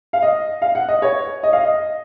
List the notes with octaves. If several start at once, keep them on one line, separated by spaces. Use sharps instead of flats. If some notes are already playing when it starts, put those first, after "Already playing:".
F5
D#5
F5
F#5
D#5
C#5
D#5
F5
D#5